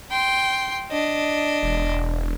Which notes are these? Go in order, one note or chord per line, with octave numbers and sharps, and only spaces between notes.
G5 C6
D4 D#5
E1